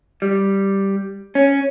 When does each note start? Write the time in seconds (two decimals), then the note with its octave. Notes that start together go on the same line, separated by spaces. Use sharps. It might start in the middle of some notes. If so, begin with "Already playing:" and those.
0.22 G3
1.35 C#4